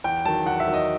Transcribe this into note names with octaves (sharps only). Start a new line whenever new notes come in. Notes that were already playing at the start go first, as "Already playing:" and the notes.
E2 G5
D#3 F#3 A5
E2 F#5
E5
D#3 F#3
D#5